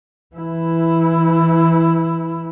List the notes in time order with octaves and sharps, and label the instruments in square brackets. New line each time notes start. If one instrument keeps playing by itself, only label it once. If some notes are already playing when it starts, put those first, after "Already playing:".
[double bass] E3 E4